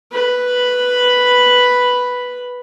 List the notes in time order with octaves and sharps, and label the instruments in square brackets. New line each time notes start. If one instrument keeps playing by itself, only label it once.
[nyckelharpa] B4 B5